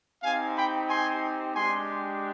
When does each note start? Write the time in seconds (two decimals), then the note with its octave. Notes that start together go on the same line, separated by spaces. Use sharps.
0.23 C4 D#4 G4 F5 G#5
0.56 G5 B5
0.89 G#5 C6
1.55 G#3 D4 G4 G#5 C6